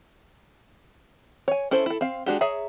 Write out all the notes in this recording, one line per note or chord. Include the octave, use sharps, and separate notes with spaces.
C#5 G#5
C#4 E4 A4 C5
E4 A4
C4 F5
G#3 D4 F#4 G4
G#4 C#5 E5 A#5